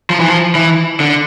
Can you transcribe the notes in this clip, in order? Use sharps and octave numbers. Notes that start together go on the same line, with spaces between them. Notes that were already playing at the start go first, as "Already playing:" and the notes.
F3
E3
F3
E3
D3